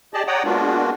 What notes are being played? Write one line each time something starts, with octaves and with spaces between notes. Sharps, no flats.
G4 G#4 D5 D#5 A5
C#5 D5 F#5 G5 A#5 D#6
G#3 A#3 B3 D4 F4 F#4